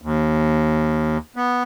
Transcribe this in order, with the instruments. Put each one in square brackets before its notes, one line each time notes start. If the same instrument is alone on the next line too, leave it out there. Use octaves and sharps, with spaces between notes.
[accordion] D#2
B3